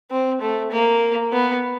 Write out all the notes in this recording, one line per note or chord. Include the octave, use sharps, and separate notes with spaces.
C4
A3
A#3
B3